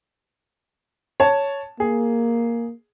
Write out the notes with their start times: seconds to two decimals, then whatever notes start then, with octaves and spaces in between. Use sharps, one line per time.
1.20 C#5 A5
1.80 A#3 G#4